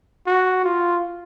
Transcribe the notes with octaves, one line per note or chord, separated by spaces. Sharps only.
F#4
F4